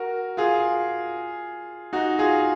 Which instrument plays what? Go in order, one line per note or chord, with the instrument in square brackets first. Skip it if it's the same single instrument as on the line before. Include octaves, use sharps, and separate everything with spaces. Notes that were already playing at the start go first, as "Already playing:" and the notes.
Already playing: [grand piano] F#4 A#4
F4 G#4
D#4 F#4
F4 G#4